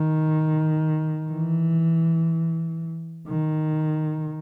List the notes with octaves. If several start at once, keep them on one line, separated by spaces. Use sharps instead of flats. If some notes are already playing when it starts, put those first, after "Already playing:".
Already playing: D#3
E3
D#3